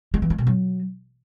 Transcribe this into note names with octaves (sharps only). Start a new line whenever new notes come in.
G#3
E3
G#3
B2
F#3